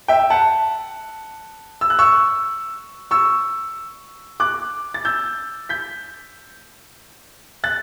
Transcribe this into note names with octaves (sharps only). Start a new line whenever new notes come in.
E5 G5
F#5 A5
E6
F#6
C#6 E6
C#6 E6
D6 F#6
A6
E6 G6
G6 B6
F#6 A6